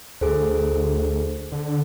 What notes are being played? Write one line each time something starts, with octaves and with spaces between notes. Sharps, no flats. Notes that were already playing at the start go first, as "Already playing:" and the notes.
D2 G#4 A4 C5
D3